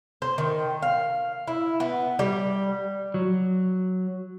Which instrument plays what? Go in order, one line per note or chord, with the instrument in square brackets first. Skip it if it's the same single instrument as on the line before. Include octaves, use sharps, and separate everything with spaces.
[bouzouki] C5
D#3
F5
E4
B3
G3
[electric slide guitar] F#3